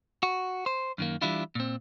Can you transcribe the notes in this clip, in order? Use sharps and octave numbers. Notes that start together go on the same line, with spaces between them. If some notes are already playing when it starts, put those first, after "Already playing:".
F#4
C5
F#2 D#3 A#3
E3 G3 D4 E4 F4
A#2 C4